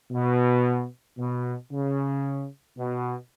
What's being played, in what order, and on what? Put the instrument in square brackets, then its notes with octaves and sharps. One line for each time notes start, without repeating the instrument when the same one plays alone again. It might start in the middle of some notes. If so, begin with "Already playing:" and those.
[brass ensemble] B2
B2
C#3
B2